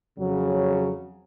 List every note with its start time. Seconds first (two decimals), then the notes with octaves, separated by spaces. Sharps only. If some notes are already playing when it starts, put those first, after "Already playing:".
0.18 F2 C#3 F#3